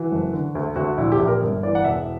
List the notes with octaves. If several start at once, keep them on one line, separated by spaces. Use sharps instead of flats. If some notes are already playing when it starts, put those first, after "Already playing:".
Already playing: E3 F#4
F#1
D3
D2
D2 F#4
A#1 E4
G4
A#1
A#4
G1
E3 D5
F#5
E1 E5